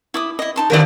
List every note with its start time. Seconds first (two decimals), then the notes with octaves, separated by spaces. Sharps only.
0.14 E4 D6 D#6
0.39 E4 D#5
0.56 D#4 A5 C6
0.70 G2 D3 A#4 B4 D5